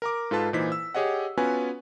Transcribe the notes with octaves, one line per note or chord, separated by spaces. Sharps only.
A#4 A#5 D6
G#2 F4 A4 B4 A5
A#2 E3 D#4 C5 B6
E6
G4 G#4 C#5 D#5 F#5
B3 C#4 F4 F#4 B4 G#5